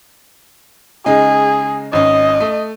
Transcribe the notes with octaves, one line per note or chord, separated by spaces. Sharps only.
C#3 G#3 D#4 G#4
G#1 C#4 D#5
A3